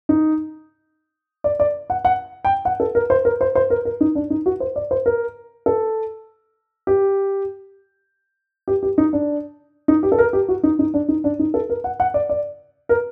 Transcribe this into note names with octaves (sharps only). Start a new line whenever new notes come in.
D#4
D5
D5
F#5
F#5
G5
F#5
A4
A#4
C5
A#4
C5
C5
A#4
A#4
D#4
D4
D#4
F#4
C5
D5
C5
A#4
A4
G4
G4
G4
D#4
D4
D#4
G4
A4
A#4
G4
F#4
D#4
D#4
D4
D#4
D4
D#4
A4
A#4
F#5
F#5
D5
D5
A#4